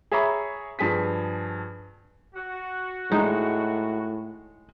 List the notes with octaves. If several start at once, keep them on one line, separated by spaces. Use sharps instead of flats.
G#4 C#5 E5 A#5 B5 C#6
G2 F3 G#4 G#5 B6
F#4
A2 G#3 D#4